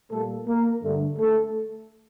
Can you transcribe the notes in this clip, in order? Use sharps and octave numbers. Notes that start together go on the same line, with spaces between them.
A#2 G3 A3 A#3 A4
A#3 A#4
G2 D3 A3
A3 A4